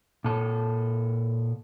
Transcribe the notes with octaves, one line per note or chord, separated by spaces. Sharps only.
A#2 A4